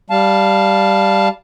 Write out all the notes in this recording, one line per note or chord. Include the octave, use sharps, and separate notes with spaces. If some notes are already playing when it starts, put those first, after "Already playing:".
G3 F5 A5